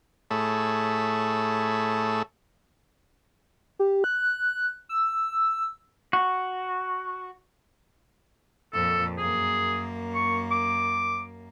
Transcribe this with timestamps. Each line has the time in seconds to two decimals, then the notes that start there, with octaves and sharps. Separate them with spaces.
0.31 A2 A3 G#4 C#5 A5 B5
3.79 G4
4.04 F#6
4.89 E6
6.13 F#4
8.73 F2 A#2 A4
9.18 F#2 A#3 G#4
10.15 C#6
10.51 D6